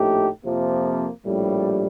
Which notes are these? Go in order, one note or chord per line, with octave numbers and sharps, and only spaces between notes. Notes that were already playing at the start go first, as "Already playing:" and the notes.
Already playing: A#1 A2 A3 D#4 G4
F2 C3 F3 A#3
A#1 A2 G3